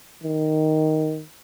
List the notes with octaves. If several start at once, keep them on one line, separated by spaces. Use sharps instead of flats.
D#3